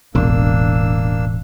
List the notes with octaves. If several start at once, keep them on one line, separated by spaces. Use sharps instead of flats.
E1 A1 A#3 D4 E6